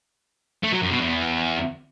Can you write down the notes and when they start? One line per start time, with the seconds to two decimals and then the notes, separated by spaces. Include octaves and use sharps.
0.63 A3
0.72 F#3
0.82 F#2
0.91 B2
1.00 E2